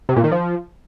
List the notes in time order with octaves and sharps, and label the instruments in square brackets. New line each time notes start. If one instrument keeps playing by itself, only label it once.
[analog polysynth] C3
A#2
D#3
F3